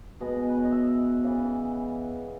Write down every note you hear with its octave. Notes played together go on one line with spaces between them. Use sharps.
B2 G#3 B3 D#5
B4
C#5
D#5
E5
C#3 E3 B3